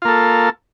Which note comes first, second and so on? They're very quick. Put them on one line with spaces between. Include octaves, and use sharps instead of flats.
F4 A#3 A4